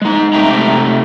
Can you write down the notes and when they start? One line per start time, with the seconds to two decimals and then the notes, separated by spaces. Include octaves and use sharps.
0.02 G#3 D#4
0.33 C3 A3 G4 E5 G5 A#5